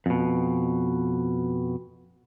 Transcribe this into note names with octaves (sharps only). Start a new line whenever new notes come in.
F2 B2